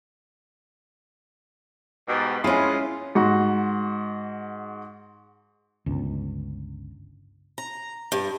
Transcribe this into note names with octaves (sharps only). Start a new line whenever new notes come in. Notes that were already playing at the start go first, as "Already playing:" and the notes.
G#2 B2 G4
G#3 C#4 E4 F4
G#2 F#4
G1 C#2
A#5
G2